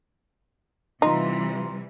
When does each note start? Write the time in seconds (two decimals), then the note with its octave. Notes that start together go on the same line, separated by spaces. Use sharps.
1.02 C3 E3 G3 D#4 F4 A#5 C6